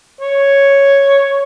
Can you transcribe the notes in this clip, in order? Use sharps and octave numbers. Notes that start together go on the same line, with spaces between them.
C#5